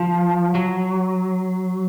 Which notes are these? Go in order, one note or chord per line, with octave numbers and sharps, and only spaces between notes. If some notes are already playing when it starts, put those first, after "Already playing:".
Already playing: F3
F#3